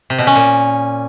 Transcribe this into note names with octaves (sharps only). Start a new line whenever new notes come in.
C3
B2
C#4
A#2